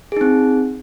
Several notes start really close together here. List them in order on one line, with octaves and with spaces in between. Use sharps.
G#4 D#4 C4